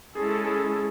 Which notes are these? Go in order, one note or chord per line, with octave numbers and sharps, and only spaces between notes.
G#3 C#4 E4 G#4 A4
G#4